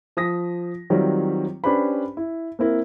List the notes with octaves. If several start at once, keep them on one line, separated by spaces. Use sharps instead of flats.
F3 D#6 A#6 B6
D#3 F#3 G3 C4 F4 C#5
C#4 D4 G4 B4 C5 B5
E4
A#3 C4 E4 A#4